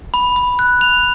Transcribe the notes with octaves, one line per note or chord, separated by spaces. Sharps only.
B5
B5
F#6
F7